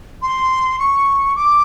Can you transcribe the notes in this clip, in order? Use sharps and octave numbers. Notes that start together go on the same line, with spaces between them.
C6
C#6
D6